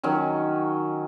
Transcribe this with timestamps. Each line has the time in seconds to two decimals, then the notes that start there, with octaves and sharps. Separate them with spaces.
0.04 D#3 F#3 C#4